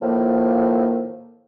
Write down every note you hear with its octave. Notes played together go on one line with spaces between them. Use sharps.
A2 D#3 F3 A#3